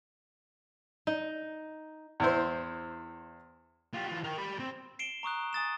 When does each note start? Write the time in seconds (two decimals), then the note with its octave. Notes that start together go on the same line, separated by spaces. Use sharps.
1.07 D#4
2.20 E2 E4 C5
3.94 F4 G4
4.07 E3 F4
4.24 A#4 G5
4.38 G4 B5
4.59 C4
4.99 C7 D7 E7 G7
5.23 A#5 C#6 D#6 F#6
5.53 G#5 D#6 A6 E7